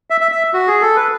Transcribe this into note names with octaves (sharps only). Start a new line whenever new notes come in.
E5
E5
E5
F#4
G#4
A4
B4